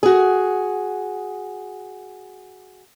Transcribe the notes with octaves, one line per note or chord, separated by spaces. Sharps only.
F#4 G#4